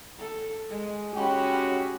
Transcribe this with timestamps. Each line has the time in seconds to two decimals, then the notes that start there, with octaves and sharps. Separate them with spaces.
0.18 A4
0.69 G#3
1.14 G#3 C#4 F#4 G4 B5